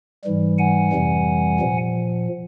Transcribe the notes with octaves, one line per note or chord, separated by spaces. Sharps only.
G#2 E3 G3
F#5 G#5
F2 C3 E3 G3
A#2 F3